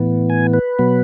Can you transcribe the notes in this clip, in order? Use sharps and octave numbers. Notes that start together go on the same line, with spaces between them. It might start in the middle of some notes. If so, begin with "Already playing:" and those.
Already playing: A2 E3 B3
G#5
B4
B2 F#3 B3